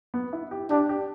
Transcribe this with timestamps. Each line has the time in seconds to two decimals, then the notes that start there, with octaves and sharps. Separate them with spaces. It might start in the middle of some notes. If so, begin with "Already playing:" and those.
0.14 B3
0.33 E4
0.51 G4
0.70 D4 G4
0.89 G4